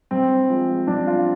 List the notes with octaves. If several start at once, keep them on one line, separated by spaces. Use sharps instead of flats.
G2 C4
F3 G#3
G2 D4
F4